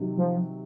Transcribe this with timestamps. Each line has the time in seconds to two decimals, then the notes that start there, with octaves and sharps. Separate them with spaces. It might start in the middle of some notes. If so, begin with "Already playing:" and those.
Already playing: C3 D#3 F#3
0.17 F3